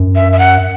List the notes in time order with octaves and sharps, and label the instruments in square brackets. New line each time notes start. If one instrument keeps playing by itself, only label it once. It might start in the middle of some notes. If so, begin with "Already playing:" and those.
Already playing: [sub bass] F#2
[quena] E5
E5
F#5